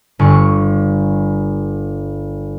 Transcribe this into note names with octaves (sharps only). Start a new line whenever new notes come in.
G1 C#6